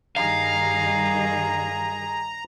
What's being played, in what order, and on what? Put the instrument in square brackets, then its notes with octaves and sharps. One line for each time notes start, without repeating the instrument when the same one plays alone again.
[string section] G2 D#3 G3 [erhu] G#4 [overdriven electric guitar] F5 [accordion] A#5